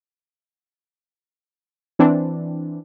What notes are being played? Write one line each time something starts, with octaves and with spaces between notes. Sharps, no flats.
E3 C4 D4